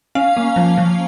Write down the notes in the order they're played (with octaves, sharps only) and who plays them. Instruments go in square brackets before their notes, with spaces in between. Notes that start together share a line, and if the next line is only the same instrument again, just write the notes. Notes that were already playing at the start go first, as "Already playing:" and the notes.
[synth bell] C#4 F5
A#3
F3
F3